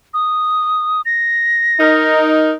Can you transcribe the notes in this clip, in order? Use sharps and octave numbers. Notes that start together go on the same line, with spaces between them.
D#6
A#6
D#4 A#4